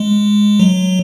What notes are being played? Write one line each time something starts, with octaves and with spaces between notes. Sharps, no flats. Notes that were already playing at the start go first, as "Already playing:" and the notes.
Already playing: G#3
F#3